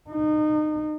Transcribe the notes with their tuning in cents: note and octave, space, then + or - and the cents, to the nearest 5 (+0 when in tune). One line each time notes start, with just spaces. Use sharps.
D#4 -30